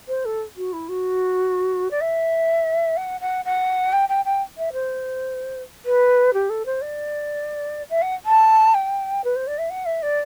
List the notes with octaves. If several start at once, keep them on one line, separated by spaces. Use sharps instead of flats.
C5
A4
F#4
E4
F#4
D5
E5
F#5
F#5
F#5
G5
G5
G5
E5
C5
B4
G4
A4
C5
D5
E5
F#5
A5
G5
B4
C5
D5
E5
F#5
E5
D5